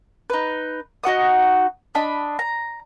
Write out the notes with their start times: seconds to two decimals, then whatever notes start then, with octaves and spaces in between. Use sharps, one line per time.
0.30 D#4 B4
1.04 D#4 F#4 F#5 D#6
1.95 D4 D#5 B5
2.39 A#5